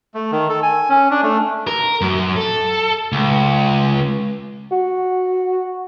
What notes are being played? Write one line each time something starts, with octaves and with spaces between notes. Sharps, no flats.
A3
D#3
A4
G#5
C#4
D4
A3
A#4
F#2
A4
C#2
F#4